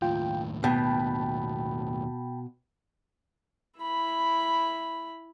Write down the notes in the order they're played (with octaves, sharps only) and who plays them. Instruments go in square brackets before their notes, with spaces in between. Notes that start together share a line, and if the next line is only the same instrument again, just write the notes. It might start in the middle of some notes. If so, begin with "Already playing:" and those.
[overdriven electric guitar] D#2 A2 [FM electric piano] F4 G5
[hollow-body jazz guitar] B2 [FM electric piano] G5 A5 B5
[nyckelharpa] E4 B5